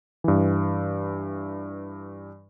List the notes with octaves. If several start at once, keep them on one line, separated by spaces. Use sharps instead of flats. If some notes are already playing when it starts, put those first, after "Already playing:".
G2 E3